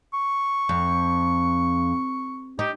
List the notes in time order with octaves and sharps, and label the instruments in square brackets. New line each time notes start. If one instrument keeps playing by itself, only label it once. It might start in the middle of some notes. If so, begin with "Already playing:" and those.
[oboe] C#6
[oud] F2
[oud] D#4 [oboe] G4